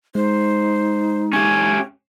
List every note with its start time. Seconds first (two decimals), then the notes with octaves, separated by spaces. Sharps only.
0.15 G#3 D#4 C5
1.33 C#4 G4 G#6